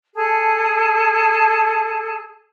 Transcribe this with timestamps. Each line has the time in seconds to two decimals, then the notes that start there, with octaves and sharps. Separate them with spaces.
0.15 G#4 A4 A5